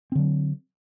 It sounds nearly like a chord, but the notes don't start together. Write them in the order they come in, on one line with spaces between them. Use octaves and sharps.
C4 D3 F#3